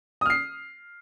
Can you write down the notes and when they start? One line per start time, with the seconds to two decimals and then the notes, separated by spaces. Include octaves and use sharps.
0.21 D#6
0.26 F6
0.30 C7